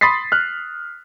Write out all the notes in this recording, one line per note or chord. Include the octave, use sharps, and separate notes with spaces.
B5 C6 D#6 A6 B6 C7
F6 F#6